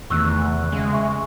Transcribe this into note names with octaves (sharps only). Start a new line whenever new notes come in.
E2 C3 D#3 A3 C#6 E6 F#6
C#3 G#3
E5 C#6